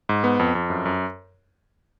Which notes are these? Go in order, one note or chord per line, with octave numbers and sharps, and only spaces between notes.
G#2
B3
F2
F2
F#2
F#2